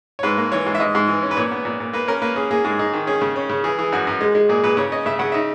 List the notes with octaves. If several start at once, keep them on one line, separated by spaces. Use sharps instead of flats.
C#5
G#2 B4
A#3
E3 C#5
G#2
E5
G#2 D#5
G#2
E3
C#4
B4
A#2 C#5
B3
A#2
A#2
A#3 B4
C#4 A#4
A#3 B4
C#4 G#4
A#3 G#4
G#2 G#4
D#4 G#4
D#3
C#4 G#4
C#3
C#4
C#3
E3 G#4
E3 G#4
F#2 F#4
F#2
G#3
G#3
A#2 G#4
A#2 B4
C#3 C#5
C#4 D#5
C#3 E5
C#3 F#5
D#4 E5